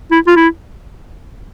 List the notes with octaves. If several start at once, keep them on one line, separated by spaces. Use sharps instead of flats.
E4
F4
E4